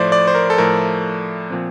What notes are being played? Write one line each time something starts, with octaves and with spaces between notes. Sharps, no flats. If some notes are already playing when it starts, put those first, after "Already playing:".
Already playing: A2 F3 A3 C5 D5
D5
C5
A#4
A4
A2 F3 A3 A#4
A#2 F3 C4